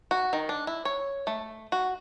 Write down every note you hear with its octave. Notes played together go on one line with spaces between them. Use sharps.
F#4
D#3
D4
E4
C#5
A3
F#4